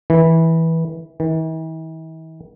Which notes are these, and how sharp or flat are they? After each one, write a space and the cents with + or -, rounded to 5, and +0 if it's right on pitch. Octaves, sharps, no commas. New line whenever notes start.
E3 -15
E3 -45